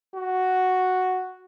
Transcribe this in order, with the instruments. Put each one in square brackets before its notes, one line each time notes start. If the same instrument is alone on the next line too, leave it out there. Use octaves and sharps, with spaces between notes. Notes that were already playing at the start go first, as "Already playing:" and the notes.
[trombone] F#4